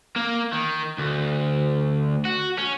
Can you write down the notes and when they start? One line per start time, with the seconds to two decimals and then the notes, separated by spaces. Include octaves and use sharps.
0.16 A#3
0.53 D#3
0.98 D2
2.25 F#4
2.58 C#4